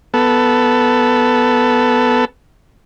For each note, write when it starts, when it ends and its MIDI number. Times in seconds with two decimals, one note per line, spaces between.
0.14 2.25 59
0.14 2.25 69